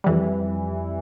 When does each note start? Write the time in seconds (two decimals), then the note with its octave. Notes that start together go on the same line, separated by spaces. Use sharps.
0.04 F2 E3 G3